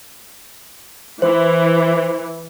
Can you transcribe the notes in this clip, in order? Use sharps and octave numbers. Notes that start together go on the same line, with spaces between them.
E3 C5